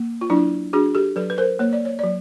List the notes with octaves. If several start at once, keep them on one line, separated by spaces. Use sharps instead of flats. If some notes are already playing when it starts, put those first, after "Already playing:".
Already playing: A#3
F4
F#3 D4 E4
D4 F#4 G#4
G4 A4
F#3 A4 B4
B4
A#4 C5
A#3 C#5
D5
C#5
F#3 D5